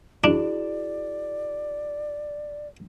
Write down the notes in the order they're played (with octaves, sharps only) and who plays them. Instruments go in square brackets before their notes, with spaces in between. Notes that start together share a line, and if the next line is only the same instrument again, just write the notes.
[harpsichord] D4 [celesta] E4 F#4 G#4 [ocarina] D5